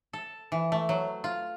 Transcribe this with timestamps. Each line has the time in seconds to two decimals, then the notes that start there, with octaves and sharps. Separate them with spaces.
0.13 A4
0.52 E3
0.72 A3
0.89 F#3
1.24 F4